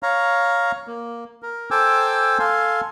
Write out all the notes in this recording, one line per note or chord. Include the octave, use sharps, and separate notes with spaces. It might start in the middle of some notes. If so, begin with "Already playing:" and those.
C#5 F5 A#5
A#3
A#4
A4 C5 G5 G#5 D6 E6
A4 F5 G#5 C6